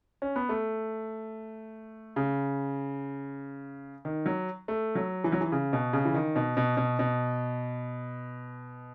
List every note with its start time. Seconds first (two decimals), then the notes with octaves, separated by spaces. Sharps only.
0.22 C#4
0.36 B3
0.49 A3
2.16 C#3
4.05 D#3
4.26 F#3
4.68 A3
4.95 F#3
5.24 E3
5.32 F#3
5.41 E3
5.52 C#3
5.73 B2
5.93 C#3
6.05 E3
6.14 D#3
6.36 B2
6.57 B2
6.77 B2
6.99 B2